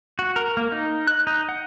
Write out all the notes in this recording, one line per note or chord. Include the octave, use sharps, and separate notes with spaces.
F#4
A#4
A#3
D#4
F#6
D#4
F#5